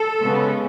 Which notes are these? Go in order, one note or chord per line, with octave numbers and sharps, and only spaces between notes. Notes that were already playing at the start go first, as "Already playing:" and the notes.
Already playing: A4
C#3 G#3 B3